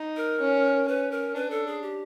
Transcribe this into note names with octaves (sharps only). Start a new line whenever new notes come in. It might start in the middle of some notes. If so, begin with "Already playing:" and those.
Already playing: D#4
A#4
C#4
C#4 B4
A#4
D4 B4
A4
G#4
G4